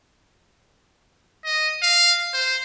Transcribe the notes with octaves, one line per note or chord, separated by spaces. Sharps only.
D#5
F5
C5